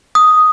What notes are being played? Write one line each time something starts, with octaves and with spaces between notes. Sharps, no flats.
D#6